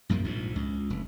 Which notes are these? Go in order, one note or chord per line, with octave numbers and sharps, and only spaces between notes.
C2 F#2 F3 A#3
A#1 G#2
C#2
F1